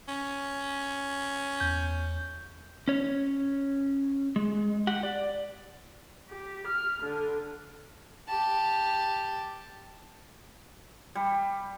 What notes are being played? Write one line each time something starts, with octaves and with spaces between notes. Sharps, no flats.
C#4
E2 G6
C#4 C#5
G#3
G4 F#5
D5
G4
F6
D3
G4 A5
G3